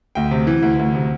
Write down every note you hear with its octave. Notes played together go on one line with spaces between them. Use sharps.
D2 G5
C3
E3
D2
D2
C3